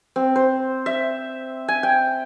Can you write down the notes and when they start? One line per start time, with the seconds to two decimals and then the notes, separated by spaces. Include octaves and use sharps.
0.16 C4
0.36 C5
0.86 E5
1.68 G#5
1.83 G5